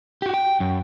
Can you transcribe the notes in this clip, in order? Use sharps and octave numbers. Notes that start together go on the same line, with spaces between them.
F#4 G4
G5
F#2